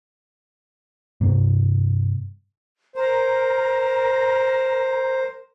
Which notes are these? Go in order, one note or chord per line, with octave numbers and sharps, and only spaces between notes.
G2 C3
A#4 C5 A#5